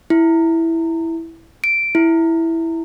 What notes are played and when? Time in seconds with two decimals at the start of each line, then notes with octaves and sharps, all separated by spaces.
0.10 E4
1.64 D7
1.95 E4